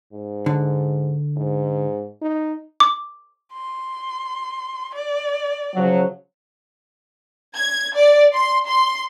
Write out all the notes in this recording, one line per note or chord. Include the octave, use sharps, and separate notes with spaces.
G#2
D3
G#2
D#4
D6
C6
D5
C#3 F3 F#3
G#6
D5
C6
C6